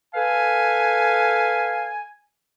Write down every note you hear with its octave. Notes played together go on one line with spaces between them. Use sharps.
A4 B4 F5 G#5